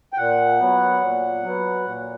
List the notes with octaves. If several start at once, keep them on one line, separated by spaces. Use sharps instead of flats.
G5
A#2 F#5
F#3 B3
A#2
F#3 B3
A#2